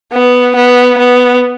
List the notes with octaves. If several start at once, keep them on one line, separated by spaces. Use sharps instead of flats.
B3
B3
B3